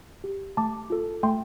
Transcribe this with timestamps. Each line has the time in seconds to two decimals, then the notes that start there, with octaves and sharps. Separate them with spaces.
0.24 G4
0.57 A3 A5 D6
0.90 F4 A4
1.23 A3 G5 C6